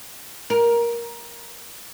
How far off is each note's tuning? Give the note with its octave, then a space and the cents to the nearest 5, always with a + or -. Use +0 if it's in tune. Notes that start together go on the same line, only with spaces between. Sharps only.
A#4 +15